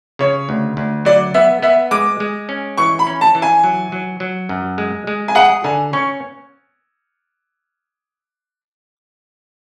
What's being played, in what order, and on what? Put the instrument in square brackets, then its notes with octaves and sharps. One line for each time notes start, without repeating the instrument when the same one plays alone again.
[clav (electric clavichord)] C#3 [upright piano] C#5
[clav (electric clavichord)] D2
D2
[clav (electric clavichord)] F#3 [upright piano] D5
[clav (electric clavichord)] B3 [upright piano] E5
[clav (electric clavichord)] B3 [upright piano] E5
[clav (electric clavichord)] G#3 [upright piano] D6
[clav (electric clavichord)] G#3
C#4
[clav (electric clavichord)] E3 [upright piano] C#6
[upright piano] B5
[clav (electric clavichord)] C#4
[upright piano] A5
[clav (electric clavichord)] E3
[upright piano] G#5
[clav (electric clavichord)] F#3
F#3
F#3
F#2
G#3
G#3
[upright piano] G#5
[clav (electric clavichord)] G#4 [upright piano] F#5
[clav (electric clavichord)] D3 [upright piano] G#5
[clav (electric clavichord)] C#4 [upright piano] C#6